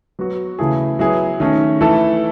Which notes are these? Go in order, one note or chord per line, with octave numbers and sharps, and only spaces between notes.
F#3 B3 F#4
C#3 E3 A3 E4 G#4
F#3 B3 E4 G#4
D#3 A3 C#4
E3 A3 E4 A4